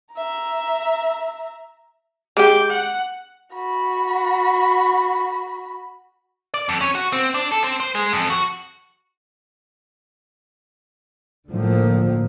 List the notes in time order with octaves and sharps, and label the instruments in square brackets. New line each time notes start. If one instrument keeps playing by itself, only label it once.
[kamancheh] E5 A#5
[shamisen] G#3 G4 [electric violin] D6 G6
[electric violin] F#5
[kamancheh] F#4 B5
[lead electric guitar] D5
F2
C#4
F#4
C4
D4
A4
C4
C5
G#3
F2
F#4
[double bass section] A2 D3 F3 A#3